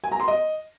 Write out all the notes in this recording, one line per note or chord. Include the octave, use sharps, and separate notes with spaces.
G#5
A#5
C6
D#5